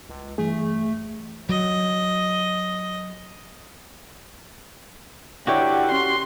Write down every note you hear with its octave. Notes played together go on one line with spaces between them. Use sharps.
C#2
G2 E3 A3 G#4
F#3 D#5
D3 E4 F#4 G4 B4 C#5 G5
C#4 C6